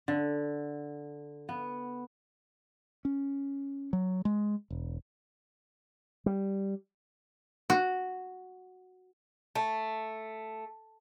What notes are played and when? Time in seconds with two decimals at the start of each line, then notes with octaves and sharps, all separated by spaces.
0.08 D3
1.49 B3
3.05 C#4
3.93 F#3
4.25 G#3
4.70 E1
6.26 G3
7.70 F#4
9.55 A3